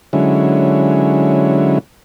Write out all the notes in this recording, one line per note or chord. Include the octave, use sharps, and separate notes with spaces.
D3 F#3 G#3 C#4 E4